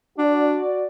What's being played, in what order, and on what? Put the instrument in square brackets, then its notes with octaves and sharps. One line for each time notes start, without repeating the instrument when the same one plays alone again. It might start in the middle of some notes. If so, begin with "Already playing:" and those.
[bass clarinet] D4 [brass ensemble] F#4 D5